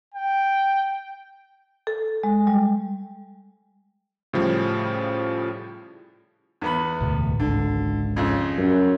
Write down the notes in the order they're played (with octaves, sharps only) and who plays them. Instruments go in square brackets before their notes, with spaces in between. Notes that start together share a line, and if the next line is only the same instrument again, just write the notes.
[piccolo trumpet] G5
[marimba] A4
G#3
G3
[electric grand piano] A2 C#3 F3 G3
[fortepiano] E2 B3 B5
[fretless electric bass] E1 D2 A2
[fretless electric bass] G#1 C#2 [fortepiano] D3
[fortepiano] F2 C#3
[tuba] F#2